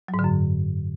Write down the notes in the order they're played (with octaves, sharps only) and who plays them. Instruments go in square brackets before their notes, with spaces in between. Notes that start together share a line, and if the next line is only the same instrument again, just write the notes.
[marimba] F#3
G#2
D3
F#2